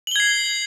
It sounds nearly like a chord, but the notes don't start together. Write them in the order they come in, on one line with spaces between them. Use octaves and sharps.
F#7 G7 G#6 C7